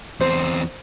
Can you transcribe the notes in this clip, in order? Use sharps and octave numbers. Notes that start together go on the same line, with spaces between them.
E2 C4 C5